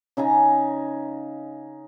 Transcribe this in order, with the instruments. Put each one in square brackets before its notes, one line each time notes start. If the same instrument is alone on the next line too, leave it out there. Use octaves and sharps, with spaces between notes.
[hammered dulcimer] C#3 D#4 G#5 A#5